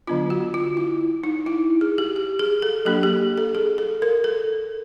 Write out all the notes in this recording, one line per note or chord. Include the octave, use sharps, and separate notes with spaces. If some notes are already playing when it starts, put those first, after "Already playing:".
D3 F#3 B3 D4 F4
F#4
F4
E4
D#4
E4
G#4
G4
G4
G#4
A4
F#3 A#3 D4 G4
G4
A4
G#4
A4
A#4
A4